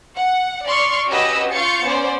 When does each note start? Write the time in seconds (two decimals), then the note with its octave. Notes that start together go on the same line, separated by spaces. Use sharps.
0.17 F#5
0.66 D5 C6 C#6 F6
1.08 C#4 F#4 G4 B4 D#5 E6
1.52 F4 F5 C#6 G6 A6 C#7
1.84 B3 C#4 C5 D5